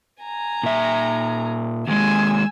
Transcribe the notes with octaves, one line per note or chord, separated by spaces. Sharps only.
G#5 A#5
A#2 E5
D#2 G#3 G#5 E6